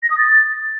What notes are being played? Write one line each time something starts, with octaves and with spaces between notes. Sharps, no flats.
A#6
D#6
A6